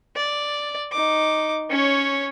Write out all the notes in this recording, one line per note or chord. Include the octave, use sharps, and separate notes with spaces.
D5
D#4 D6
C#4 C#5